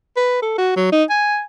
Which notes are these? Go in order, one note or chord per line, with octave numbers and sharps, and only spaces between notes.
B4
A4
F#4
F#3
D#4
G#5